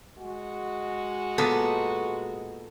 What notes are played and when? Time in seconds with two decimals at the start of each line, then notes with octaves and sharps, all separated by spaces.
0.18 G#3 F#4
1.38 A#2 B3 A4